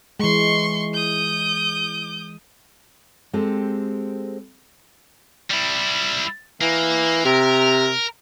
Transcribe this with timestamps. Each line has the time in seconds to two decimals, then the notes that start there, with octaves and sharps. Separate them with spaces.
0.20 E3 G#3 C6 C#6
0.94 D#6 G6
3.33 G#3 C4 G4 A4
5.51 G3 E4
6.61 E3 A#3
7.25 C3 A#4